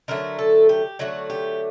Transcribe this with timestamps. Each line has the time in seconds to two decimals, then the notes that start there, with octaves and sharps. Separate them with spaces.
0.08 D3 F#3 A3 A#4
0.39 A4
0.69 G4
0.99 D3 F#3 A3 F#4
1.30 G4